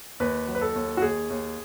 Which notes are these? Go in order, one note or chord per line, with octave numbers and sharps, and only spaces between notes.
D#2 B4
F#3
B4
A4
D#2
F#4
D#2 G#4
D#2